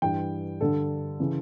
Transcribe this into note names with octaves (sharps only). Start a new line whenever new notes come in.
G2 E3 G5
G2 D3 A4
C#3 E3